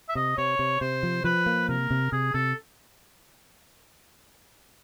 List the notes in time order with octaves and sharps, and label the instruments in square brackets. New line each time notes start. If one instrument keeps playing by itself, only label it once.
[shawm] E5
[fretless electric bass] C3 [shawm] D#5
[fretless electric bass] C3 [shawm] C#5
[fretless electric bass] C3
[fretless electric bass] C3 [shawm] C5
[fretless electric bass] F3
[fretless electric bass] F3 [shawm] B4
[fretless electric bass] A#3
[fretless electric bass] C3 [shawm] A#4
[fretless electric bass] C3
[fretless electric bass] C3 [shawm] G#4
[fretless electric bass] C3 [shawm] A4